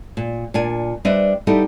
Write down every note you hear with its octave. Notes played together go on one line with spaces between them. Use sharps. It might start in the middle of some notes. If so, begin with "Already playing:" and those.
A#2
A#2 D4 G#5
G3 D4 B4 C5 D#5 E5
G3 B3 D#4 E4 G4 A4